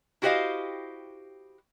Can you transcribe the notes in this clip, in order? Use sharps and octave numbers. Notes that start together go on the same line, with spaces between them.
E4 F#4 G4 C5 D#5 F5